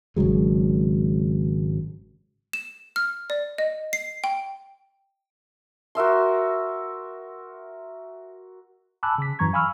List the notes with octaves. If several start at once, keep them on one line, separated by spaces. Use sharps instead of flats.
G#1 C#3 F#3 G#3
E7
F6
D5
D#5
C7
G5
F#4 A#4 E5 C6
G#5 A5 B5 D6 E6 F#6
C#3 B6
F#2 E3 F#3 A#5 C#6 G#6
F5 G#5 B5 C#6 E6 F6